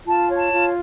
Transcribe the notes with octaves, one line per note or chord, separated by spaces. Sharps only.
F4 A5
C#5
A5
F4